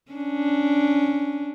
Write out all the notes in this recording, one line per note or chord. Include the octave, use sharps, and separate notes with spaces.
C#4 D4